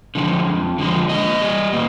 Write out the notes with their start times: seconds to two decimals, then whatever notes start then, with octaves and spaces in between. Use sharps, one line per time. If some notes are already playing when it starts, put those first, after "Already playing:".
0.15 D3 F3 G#3
0.46 F2
0.79 D3 F3 G#3
1.09 A#2 D#5
1.42 G3
1.73 A#2